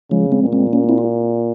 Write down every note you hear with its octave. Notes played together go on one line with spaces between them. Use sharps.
C#3 F3 G#3
G#3 C4
A#2
G#3 C4
A#3 C#4
C4 E4
F4